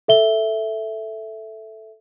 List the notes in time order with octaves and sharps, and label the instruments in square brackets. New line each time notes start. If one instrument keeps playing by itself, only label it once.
[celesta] A4 E5 G7